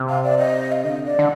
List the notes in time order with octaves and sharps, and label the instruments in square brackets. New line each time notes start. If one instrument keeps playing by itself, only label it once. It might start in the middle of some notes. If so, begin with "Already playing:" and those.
Already playing: [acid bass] C3
[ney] F5
D5
D#5
F5
[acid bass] D3 [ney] D#5
[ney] D5
[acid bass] D3